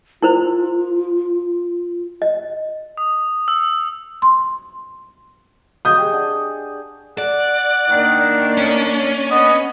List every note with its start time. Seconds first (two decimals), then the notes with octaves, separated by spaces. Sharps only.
0.22 E4 F4 A#4 C5
2.22 D#5
2.97 D#6
3.48 E6
4.22 C6
5.85 D#5 C#6 D#6 G6
5.98 G4 G#4
6.12 D4 F#5
7.18 D5 F#5
7.90 D#3 A#3 D4
8.57 C#4
9.30 B3 D#5